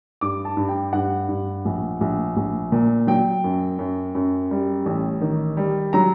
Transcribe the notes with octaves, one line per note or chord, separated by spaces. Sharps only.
G2 D6
A5
G2
G5
G2 F#5
G2
A#1
A#1
A#1
A#2
F#3 G5
F#2
F#2
F#2
G3
A1
D#3
G3
F#3 A#5